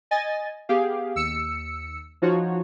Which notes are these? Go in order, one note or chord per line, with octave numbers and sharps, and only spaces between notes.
D#5 G#5 A6
B3 G4 G#4 F5
D#2 E6 C#7
F3 D#4 F4 F#4 C#5